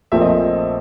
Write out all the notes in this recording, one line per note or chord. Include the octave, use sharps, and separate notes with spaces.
A#1 A#2 F3 A3 C4 E5
D#5